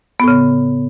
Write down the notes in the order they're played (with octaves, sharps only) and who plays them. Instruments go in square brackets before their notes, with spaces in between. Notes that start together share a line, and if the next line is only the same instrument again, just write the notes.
[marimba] B3
A2
C#3